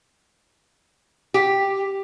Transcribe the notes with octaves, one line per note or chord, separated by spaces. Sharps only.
G4